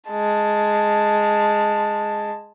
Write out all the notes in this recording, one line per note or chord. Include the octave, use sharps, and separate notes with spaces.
G#3 A5